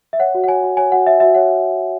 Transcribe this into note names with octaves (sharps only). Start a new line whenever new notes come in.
E5
C#5 F#5
F#4
F#5
C#5 G#5
F#4
C#5 G#5
F#4 F#5
C#5 E5
F#4 E5
C#5 F#5